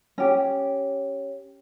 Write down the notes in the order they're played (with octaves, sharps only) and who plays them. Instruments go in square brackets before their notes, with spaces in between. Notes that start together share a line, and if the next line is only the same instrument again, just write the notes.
[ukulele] C#4 G4